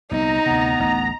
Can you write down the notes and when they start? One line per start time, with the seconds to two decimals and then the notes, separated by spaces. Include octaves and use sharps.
0.11 C2 B3 D#4 A#5
0.46 D2 C3 B3
0.80 A1 D2